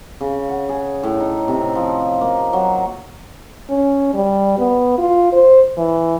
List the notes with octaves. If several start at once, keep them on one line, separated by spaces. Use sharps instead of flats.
C#3
F#5
G#4
A2
D#4
C3
F3
A#3
F#3
C#4
G3
B3
F4
C5
E3